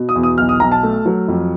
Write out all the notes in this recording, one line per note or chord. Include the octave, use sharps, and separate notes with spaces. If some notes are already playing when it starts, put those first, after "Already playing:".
Already playing: B2
D#6
E2
D#6
B1 F6
D#6
B1 A#5
A5
A3
F#3
F2